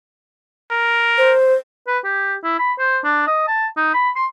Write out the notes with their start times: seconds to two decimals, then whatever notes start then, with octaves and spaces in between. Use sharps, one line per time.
0.71 A#4
1.18 C5
1.87 B4
2.04 G4
2.44 E4
2.59 B5
2.78 C5
3.04 D4
3.27 D#5
3.47 A5
3.77 D#4
3.93 B5
4.16 C6